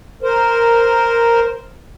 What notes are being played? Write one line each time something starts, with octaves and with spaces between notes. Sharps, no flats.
A#4 C5